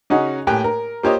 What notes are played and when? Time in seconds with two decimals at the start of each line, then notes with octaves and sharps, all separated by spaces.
0.10 C#3 C#4 D#4 F#4 G#4
0.47 A2 A#3 G4 G5 G#5 F#6
0.64 A#4
1.03 A#3 F4 G4 C5 C#5 D#5